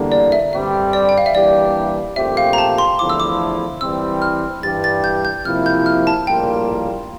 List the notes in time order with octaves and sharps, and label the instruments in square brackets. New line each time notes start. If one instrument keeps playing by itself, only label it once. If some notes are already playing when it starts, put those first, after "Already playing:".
Already playing: [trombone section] E2 D3 G3 A#3
[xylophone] D5
E5
[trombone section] G2 D3 G3 C4 G4 [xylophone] E5
[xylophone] D5
G5
F5
E5
[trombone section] E3 G3 A#3 D4 G4 [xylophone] D5
[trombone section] A#1 A#2 A3 C4 G4 [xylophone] E5
[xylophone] F5
A#5
A5
C6
[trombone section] E2 D3 F3 A3 E4 [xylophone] D6
[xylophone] E6
D6
[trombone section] E3 G3 C4 [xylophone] E6
[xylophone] F6
[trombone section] G2 E3 G3 D4 G4 [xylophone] A6
[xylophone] A6
G6
G6
[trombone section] C3 F3 A#3 E4 [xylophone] F6
[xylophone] G6
F6
A5
[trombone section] A#1 A2 G3 A#3 F4 [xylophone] G5